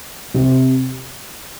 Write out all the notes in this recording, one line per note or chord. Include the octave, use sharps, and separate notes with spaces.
C3